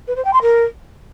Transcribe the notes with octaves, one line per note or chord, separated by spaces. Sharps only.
B4
C5
G5
C6
A#4